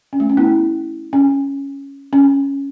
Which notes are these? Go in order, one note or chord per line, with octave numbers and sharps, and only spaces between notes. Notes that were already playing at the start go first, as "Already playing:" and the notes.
C#4
A3
C#4
B3 E4
C#4
C#4